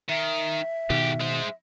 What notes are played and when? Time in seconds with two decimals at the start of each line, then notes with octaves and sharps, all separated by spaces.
0.09 D#3 E5
0.90 G#2 B2 D#3 G4
1.20 G#3 C5